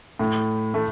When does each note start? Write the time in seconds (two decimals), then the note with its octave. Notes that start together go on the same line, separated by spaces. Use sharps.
0.19 A2
0.74 A3